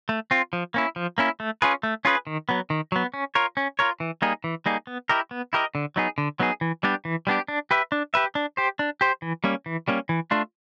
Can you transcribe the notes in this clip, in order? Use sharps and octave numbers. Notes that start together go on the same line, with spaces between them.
A3
C4 F4
F3
A#3 C#4 E4
F3
A#3 C#4 E4
A3
C#4 F4 G#4 B4
A3
C#4 F4 G#4 B4
D#3
F#3 B3
D#3
F#3 B3
C#4
F4 A#4 C#5
C#4
F4 A#4 C#5
E3
G3 A#3 D#4 G#4
E3
G3 A#3 D#4 G#4
B3
E4 G4 A#4 D#5
B3
E4 G4 A#4 D#5
D3
F#3 B3 D#4 G#4
D3
F#3 B3 D#4 G#4
E3
G3 B3 D4 G4
E3
G3 B3 D4 G4
D4
G4 B4 E5
D4
G4 B4 E5
D4
G4 C5
D4
G4 C5
E3
G3 A#3 C#4
E3
G3 A#3 C#4
E3
A3 D4 F4